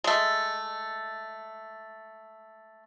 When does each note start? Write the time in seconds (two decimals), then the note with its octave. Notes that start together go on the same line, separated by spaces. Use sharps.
0.04 G#3 A3